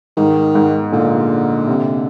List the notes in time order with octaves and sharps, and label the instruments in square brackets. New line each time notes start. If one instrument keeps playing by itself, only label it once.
[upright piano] G#2 [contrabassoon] D#3
[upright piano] G#2
[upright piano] A#2 [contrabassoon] D3
[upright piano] C3